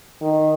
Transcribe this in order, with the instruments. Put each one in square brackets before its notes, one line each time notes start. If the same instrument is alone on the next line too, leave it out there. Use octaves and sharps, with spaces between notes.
[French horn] D#3